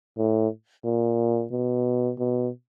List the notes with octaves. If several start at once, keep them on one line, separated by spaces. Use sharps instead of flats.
A2
A#2
B2
B2